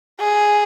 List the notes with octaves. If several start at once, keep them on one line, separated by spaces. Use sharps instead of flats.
G#4